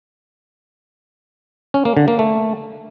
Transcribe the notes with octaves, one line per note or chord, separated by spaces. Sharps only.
C#4
A#3
D3
A#3
A3